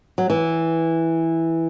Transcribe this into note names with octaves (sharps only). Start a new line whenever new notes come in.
F#3
E3